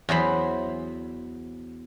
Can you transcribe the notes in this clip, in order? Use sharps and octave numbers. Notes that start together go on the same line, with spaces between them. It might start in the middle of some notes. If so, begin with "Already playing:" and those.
E2 F#3 C5 B5